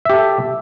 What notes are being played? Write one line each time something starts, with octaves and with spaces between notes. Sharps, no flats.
G4 A4 E5